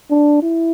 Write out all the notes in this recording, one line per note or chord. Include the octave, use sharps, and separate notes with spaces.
D4
E4